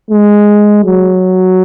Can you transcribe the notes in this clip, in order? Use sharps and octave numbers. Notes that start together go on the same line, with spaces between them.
G#3
F#3